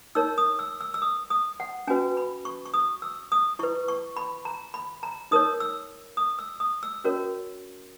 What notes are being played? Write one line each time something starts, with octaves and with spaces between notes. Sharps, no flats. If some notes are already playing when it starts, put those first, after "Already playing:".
D#4 A#4 C#5 E6
D#6
E6
E6
E6
D#6
D#6
F#5
C#4 F#4 B4 G#5
B5
C#6
C#6
D#6
E6
D#6
E4 B4 C#6
C#6
B5
A#5
B5
A#5
D#4 A#4 C#5 D#6
E6
D#6
E6
D#6
E6
C#4 F#4 A#4 C#5